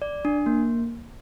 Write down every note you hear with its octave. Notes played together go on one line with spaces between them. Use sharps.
D5
D4
A#3